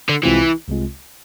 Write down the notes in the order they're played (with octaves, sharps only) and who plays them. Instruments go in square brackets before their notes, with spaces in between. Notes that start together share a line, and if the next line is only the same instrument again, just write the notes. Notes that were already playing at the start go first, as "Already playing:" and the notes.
[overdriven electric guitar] D3
[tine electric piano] C2 C3 G#3 C4 F4 [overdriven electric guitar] E3
[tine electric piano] C2 C3 G#3 C4 F4